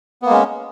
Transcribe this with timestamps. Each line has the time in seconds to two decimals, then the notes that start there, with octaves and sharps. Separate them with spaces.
0.22 B3
0.26 A#3
0.30 G#3
0.33 C#4